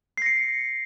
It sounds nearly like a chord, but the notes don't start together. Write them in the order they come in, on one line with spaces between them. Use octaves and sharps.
C7 A#6 C#7